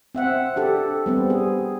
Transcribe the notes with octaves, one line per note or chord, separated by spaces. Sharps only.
C4 E5 F#5
D4 G4 A4
G3 B3 C4
G#4